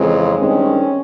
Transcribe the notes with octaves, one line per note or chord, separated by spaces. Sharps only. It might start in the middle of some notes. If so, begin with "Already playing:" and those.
Already playing: F2 C#3 E3 G#3
G2 D#3 G#3 C4 C#4